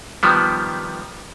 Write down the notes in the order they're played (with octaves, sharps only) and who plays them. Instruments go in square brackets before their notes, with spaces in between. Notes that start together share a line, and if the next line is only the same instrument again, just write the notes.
[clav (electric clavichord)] D#3 F3 G3 B3